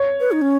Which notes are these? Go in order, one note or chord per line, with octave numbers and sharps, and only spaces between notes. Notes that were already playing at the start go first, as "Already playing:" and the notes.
Already playing: C#5
B4
D#4
C#4